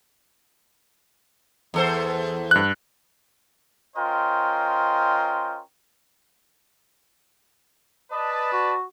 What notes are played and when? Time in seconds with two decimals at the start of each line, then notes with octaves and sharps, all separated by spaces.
1.74 E2 A4 C5
2.51 G2 F#6
3.96 C#4 F4 A#4 C5 D#5 G5
8.12 B4 D5 D#5 A5
8.53 F#4